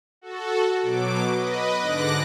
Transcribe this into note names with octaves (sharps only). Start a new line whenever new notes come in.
F#4 A4
B2 F#3 D6
B4 D#5
G#2 D3 D6 F#6 A#6